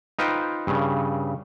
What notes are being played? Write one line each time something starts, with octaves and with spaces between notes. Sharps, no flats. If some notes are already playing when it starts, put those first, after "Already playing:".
D#4 F4 B4 C5 G5
G2 C#3